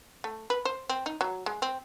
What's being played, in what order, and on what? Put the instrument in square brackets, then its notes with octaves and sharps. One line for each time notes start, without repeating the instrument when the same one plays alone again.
[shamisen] A3
B4
C5
C4
D#4
F#3
G#3
C4